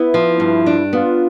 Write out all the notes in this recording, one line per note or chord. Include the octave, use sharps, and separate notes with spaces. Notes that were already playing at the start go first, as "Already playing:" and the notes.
Already playing: B3 E4
F3
G2
D4
B3 F4